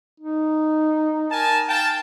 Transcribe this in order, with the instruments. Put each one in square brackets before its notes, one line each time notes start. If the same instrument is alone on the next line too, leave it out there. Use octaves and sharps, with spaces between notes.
[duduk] D#4
[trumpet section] A#4 G#5 A5
F5 G5 A5